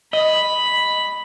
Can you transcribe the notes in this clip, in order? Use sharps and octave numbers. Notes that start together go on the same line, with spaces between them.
D#5 B5